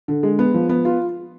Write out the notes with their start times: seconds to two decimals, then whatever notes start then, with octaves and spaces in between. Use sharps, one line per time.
0.08 D3
0.23 G#3
0.39 B3
0.54 F3
0.69 B3
0.85 F4